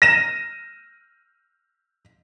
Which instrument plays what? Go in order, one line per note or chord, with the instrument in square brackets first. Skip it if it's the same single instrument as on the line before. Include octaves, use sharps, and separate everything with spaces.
[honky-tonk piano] A#6 D#7 E7